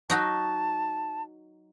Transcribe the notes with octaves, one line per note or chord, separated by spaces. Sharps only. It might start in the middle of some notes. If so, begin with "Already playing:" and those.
F#3 D#4 F#4 A5